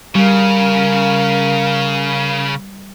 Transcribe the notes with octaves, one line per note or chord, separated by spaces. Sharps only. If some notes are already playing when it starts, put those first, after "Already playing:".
C#3 G3 A#4 F5